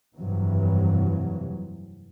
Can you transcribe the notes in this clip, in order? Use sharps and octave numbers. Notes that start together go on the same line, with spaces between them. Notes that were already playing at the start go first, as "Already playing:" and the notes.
F1 G2 C3 E3 F#3